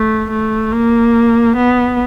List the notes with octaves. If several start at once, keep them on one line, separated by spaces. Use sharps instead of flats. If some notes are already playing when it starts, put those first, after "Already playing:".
Already playing: A3
A3
A#3
B3